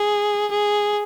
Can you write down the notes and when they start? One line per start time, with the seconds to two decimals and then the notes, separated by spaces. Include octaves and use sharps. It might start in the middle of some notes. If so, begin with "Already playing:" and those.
Already playing: G#4
0.51 G#4